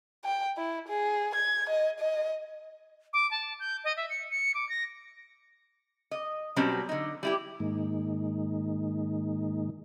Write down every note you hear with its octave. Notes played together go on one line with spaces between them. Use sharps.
G5
E4
G#4
G#6
D#5
D#5
D6
A5
G6
D#5
E5
C#7
C#7
D6
A#6
D#5
B2 F#3 G3 C4 C#4
D3 D#4
G3 E4 G4
G#2 D#3 G#3 A#3 D#4